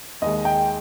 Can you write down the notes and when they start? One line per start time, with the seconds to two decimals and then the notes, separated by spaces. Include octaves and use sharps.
0.22 D#2 D#3 G#3 D#5
0.45 G5